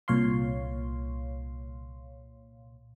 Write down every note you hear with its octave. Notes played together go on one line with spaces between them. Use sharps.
C2 A#2 C#5 F5 C6